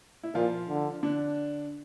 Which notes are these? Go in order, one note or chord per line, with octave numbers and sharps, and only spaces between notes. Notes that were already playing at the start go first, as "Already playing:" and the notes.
E4
A#2 F3 F4
D3
D3 D4